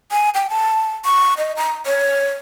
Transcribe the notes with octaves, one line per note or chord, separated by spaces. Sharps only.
G#5
G5
A5
C#6
D#5
A#5
C#5